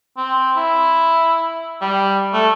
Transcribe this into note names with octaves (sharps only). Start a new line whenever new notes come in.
C4
E4
G3
A3